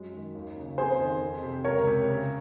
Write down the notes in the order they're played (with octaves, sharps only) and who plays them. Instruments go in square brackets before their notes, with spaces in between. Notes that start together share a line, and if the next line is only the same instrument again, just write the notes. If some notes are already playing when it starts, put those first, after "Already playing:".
Already playing: [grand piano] F#2 G#3
D#3
D#2
C#3
[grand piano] F2 [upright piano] G#4 C5
[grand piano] D#3
F2
C3
[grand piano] C#2 [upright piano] A#4 C#5
[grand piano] C3
C#3